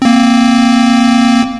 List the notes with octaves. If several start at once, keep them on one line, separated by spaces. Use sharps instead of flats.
A#3 C4